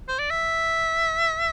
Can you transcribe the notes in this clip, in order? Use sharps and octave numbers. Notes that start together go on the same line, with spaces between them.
C5
D5
E5